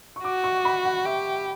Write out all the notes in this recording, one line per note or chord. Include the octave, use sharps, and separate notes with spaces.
C#6
F#4 D6
C#6
B5
F#5
G4 E5